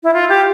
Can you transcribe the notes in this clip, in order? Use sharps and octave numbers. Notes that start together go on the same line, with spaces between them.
E4
F4
G4